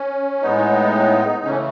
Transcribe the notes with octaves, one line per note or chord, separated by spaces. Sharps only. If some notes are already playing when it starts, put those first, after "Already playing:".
Already playing: C#4
A2 G#3 B3 D#4
C#3 E3 A3 C#4